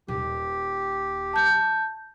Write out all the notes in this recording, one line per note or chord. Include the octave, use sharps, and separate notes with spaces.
D#1 G4
A5 G6